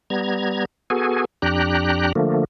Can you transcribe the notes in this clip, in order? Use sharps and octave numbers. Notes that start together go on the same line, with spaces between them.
G3 B3 A#5 G#6
B3 F#4 G#4 A4 G#5
F2 D4 G4 G5 A#5 F#6
D3 F3 A3 A#3